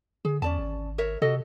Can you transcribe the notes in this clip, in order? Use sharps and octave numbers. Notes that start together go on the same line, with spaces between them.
D3 G#4
E2 C#4 D5 A5
G#1
A#4 C#5 E5
C3 F#4 A4 D#5